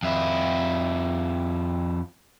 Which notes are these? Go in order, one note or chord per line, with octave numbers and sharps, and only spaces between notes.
F2 E4